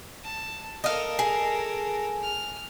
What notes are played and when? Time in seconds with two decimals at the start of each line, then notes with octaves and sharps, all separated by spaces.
0.23 A5
0.84 A4 A#4 D#5 F5
1.19 G#4
2.22 F6